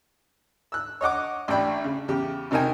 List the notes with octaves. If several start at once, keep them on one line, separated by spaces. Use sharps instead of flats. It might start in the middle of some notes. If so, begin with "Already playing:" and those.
E6 F#6
C#5 D#5 F#5 D6
A1 D4 G5 B5
C#3
E2 C#3 G4
G#1 C3 D#4 A#4 G5 G#5